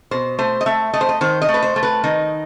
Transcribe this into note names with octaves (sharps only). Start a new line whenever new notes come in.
B2 C5
A3 C5
D#5
A3 E5
A3 D#5
C5
D#5
D#3 C5
D#5
A3
B4
C5
A3
B4
D#3 D#4